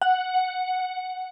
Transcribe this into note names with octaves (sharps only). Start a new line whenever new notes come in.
F#5